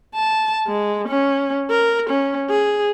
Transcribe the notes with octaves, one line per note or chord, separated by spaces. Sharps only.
A5
G#3
C#4
A#4
C#4
G#4